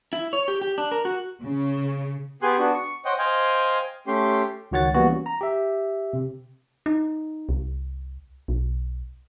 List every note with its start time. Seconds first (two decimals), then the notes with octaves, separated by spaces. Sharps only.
0.13 E4
0.33 C#5
0.48 G4
0.61 G4
0.78 D4
0.92 A#4
1.05 F#4
1.43 C#3
2.42 B3 G4 G#4 G#5 C6 F#6
2.58 B3 D4 F#4
2.74 C#6
3.05 C5 C#5 D#5 F#5 G5
3.18 C5 D#5 F5 G5 G#5
4.07 A3 C#4 G4 C6
4.72 C#2 D#3 F#4 C#5 F#5 A6
4.94 E3 G3 A#3 B3 F#4
5.09 C#4
5.26 A#5
5.41 G4 E5
6.13 C3
6.86 D#4
7.49 C2
8.48 B1